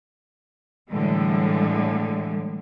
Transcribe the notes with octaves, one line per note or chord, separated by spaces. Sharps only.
A2 D3 E3 G3 G#3